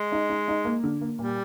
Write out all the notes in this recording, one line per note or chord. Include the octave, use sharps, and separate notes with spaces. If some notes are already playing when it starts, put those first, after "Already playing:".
Already playing: G#3
D#4
D#4
D#4
A#3
D3
A#3
A#2 G3